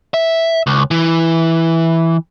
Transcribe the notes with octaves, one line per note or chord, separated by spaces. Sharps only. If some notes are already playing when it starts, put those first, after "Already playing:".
E5
C#2
E3